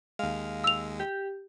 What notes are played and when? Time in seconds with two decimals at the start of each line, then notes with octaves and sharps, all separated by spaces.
0.19 D#2 G#3 F5
0.64 E6 F7
1.00 G4